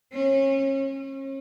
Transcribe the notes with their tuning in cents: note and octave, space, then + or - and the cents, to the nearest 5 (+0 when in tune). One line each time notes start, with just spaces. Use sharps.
C#4 -35
C#4 -40